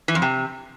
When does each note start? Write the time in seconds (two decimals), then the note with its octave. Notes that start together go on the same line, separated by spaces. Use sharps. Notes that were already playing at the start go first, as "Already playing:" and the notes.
0.08 E3
0.15 F2
0.22 C3